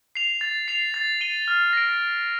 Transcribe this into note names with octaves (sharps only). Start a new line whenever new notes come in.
C7 F7
A6
C7 F7
A6
D#7 G7
F6
A#6 D7